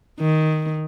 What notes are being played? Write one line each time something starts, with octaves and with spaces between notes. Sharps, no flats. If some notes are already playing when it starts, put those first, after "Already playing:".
D#3